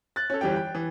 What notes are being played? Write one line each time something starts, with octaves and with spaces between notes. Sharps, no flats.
F#6 A6
C#4 A4
G1 E3 G3 G4 G5
G5
E3